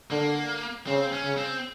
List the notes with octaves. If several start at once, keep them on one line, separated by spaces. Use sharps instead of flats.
D3 A#3
C#3 C4
C#4
C#3
C4